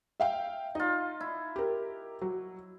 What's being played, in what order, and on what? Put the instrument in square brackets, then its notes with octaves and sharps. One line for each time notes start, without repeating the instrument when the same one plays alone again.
[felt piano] E5 F5 G5
[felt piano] D#4 [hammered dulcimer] F4 D#5
[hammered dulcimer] E4
[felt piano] G4 A#4
F#3